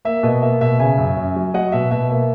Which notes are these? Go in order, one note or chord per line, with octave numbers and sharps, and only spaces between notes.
A#3 E5
B2 D#5
A#3 E5
B2 E5
C#3 E5 G#5
F#2
F#2
F#3
F#3 D#5 F#5
B2 E5
B2 E5
A#3 E5